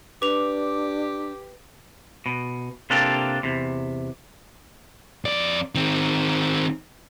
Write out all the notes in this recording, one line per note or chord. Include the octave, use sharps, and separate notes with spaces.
D4 G4 B4 D6 F7
B2
C3 A#3 D4 F4 G4 A4
E2 C3
F2 D5
D#3 C4